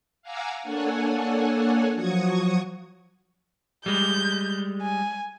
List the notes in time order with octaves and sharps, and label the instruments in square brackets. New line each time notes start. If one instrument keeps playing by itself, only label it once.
[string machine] F5 F#5 G#5 A#5 D6 E6
A#3 D4 A4 C#5 F#5 G#5
F3 F#3 F#4 C#6 D#6 G#6
[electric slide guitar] G3 G#3 [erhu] G6
[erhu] G#5